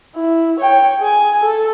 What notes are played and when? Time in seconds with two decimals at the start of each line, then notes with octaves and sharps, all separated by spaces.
0.16 E4
0.60 C#5 G5
1.00 G#4 G#5
1.43 A4